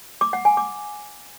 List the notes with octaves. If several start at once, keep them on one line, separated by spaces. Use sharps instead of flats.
D6
F#5
G#5
D6